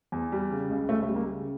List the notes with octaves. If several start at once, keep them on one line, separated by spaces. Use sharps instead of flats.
E2
G3
C#3
C#2
C#2 A3
A3
G3
A#3
C#3